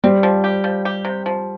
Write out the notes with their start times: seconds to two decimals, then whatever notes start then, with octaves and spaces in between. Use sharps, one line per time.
0.04 G3 C4
0.23 F3
0.44 G4
0.64 F3
0.85 G4
1.05 C3
1.26 F3